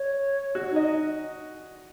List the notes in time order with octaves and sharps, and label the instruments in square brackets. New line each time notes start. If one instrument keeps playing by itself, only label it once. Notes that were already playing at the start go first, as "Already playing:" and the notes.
Already playing: [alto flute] C#5
[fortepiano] F#4
[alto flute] D#4
[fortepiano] D#5